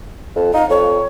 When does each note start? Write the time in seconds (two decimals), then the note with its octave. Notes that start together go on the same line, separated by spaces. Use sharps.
0.36 F2
0.54 D#4 F5
0.70 F2 C#5